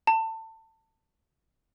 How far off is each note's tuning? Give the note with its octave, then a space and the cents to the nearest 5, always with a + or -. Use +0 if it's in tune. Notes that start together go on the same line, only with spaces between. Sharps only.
A5 +25